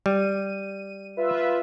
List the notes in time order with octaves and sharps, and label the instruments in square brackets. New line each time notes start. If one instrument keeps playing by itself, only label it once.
[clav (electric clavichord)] G3 [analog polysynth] D#7
[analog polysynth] F4 B4 E5